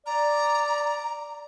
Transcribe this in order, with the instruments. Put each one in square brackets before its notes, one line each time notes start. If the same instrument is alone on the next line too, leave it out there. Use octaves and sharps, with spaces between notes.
[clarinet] D5 [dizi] A#5